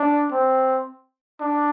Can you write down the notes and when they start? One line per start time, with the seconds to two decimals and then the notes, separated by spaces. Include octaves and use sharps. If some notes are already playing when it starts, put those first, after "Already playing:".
Already playing: D4
0.31 C4
1.41 D4